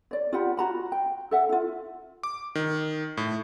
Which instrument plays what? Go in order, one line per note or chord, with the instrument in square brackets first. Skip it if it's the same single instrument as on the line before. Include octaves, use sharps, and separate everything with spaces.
[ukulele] C#5 D5
F4 G4 F#5 B5
F4 F#4 A#5 B5
G5
A4 E5 F#5
E4 F4
[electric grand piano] D6
D#3
A2